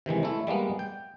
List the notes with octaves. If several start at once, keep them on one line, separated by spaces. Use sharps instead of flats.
C3 D#3 E3 G#3
A3 E4
G3 G#3 A#3 B3
G5